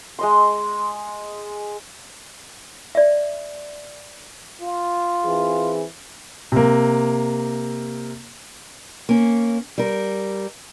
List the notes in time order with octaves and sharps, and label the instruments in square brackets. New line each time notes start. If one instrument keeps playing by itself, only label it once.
[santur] G#3 D#5 C6
[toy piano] D5 E5
[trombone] F4
[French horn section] E3 C4 G#4
[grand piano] C3 A#3
[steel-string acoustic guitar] A#3 C#4
G3 A#4